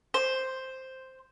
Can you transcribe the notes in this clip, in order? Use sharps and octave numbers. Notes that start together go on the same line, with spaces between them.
C5